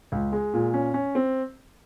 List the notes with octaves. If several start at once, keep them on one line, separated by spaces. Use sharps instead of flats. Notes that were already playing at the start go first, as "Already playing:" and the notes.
C#2
G#3
A#2
C#4
C#4
C4